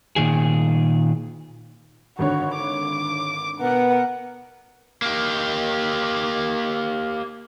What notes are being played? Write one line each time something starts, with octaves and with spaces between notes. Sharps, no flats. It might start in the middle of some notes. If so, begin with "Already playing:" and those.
A#2 D#3 G#4
G#1 D3 F#4 C#5
D6
B2 B3 A#4 F#5
A#3 G4